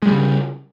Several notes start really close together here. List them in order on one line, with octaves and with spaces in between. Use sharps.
G#3 G3 C#3